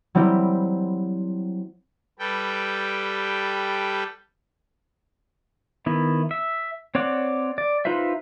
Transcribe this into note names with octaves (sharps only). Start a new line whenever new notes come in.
F#3 G3 C4 E4 G4
G3 A4 B4 G5
D#3 B3 E4
E5
C4 C#5 D5 F#5 D6
D5
D#4 F4 B4 C5 E5